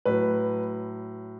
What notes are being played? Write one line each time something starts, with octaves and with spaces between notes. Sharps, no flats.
A2 F#3 B4